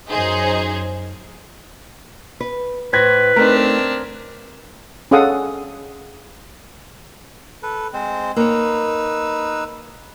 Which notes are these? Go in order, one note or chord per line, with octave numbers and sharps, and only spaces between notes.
F#2 D#4 G#4 C5
B4
A2 B4 C5 G#6 A#6
A3 C4 D4 D#4 A#4
C#4 G#4 A4 F5 F#5 D#6
A4 B4
G#3 C4 C5
A#3 D#4 B4 C#5 E6